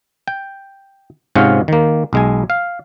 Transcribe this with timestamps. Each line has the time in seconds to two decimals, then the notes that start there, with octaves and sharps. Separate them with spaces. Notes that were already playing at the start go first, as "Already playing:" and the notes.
0.28 G5
1.35 G#2 C3 C#4 F4 F5 F#5
1.68 D#3 A#3
2.13 B1 G#3 G#5
2.50 F5